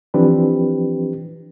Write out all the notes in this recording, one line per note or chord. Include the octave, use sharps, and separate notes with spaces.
E3 F3 C4 D4 G4 B4